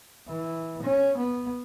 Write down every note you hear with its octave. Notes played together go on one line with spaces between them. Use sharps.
E3
C#4
B3